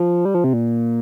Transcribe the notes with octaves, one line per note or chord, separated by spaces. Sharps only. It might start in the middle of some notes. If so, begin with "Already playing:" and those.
Already playing: F3
G3
F3
C3
A#2